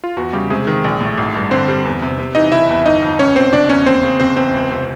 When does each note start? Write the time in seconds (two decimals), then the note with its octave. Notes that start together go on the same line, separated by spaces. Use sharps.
0.04 F4
0.17 E2 F#4
0.33 C#3 G3 G4
0.50 C3 G#3 G#4
0.67 D#3
0.84 A#1
1.01 A2
1.17 G#1
1.35 G2
1.51 D3 C4 C5
1.68 G3
1.85 E2
2.02 C3
2.19 C3
2.35 E3 D#4 D#5
2.52 F#1 E4 E5
2.69 E2
2.85 G1 D#4 D#5
3.02 F2
3.19 C#2 C#4 C#5
3.36 B2 C4 C5
3.53 F#1 D4 D5
3.69 E2 C#4 C#5
3.86 D#2 C4 C5
4.03 C#3
4.20 F#1 C4 C5
4.36 E2 C4 C5
4.54 C#2
4.71 C3